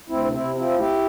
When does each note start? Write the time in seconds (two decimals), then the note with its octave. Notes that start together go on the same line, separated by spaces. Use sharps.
0.09 D2 C4 E4
0.24 C3
0.32 C4 E4
0.40 C3
0.56 F3 C4 E4
0.71 D2
0.79 E4 G4